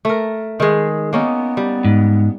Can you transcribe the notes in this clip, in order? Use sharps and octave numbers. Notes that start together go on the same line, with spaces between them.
A3 A#4
D#3 G#3 G#4
A#3 B3 C#4 D#4
G3
G#2